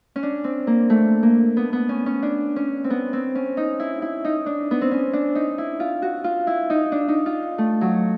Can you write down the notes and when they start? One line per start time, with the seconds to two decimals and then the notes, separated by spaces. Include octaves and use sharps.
0.16 C#4
0.23 D4
0.44 C4
0.67 A#3
0.90 A3
1.23 A#3
1.57 B3
1.73 B3
1.89 C#4
2.06 C#4
2.22 D4
2.56 C#4
2.84 C4
2.90 B3
3.13 C4
3.35 C#4
3.57 D#4
3.80 E4
4.02 E4
4.25 D#4
4.46 D4
4.71 B3
4.81 C4
4.91 C#4
5.13 D4
5.35 D#4
5.58 E4
5.80 F4
6.02 F#4
6.24 F4
6.47 E4
6.70 D#4
6.92 D4
7.08 D#4
7.26 F4
7.58 A3
7.81 F#3